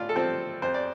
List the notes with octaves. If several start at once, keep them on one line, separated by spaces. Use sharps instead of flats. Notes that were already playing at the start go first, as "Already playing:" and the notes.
Already playing: A2 F4 D5 F5
A4
F3 C4 C5
F2 C5
D5